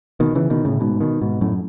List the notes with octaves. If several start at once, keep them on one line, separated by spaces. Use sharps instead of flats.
B2 D#3
C#3 E3
B2 D#3
A2 C#3
G#2 B2
B2 D#3
G#2 B2
F#2 A2